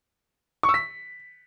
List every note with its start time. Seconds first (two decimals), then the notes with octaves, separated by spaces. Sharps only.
0.63 C#6
0.69 E6
0.74 B6